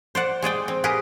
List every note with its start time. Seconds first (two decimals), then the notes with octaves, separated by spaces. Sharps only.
0.15 C5 D5 F#5
0.42 G#3 G#4 D5 G5
0.68 C4
0.84 G4 G#4 A#4 B4